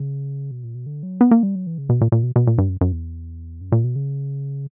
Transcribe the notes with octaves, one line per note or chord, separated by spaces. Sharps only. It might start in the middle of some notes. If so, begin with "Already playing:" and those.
Already playing: C#3
B2
A#2
B2
D3
F#3
B3
A#3
G3
F#3
E3
C#3
B2
A#2
A#2
B2
B2
A#2
G2
F#2
F#2
E2
F#2
A#2
B2
C#3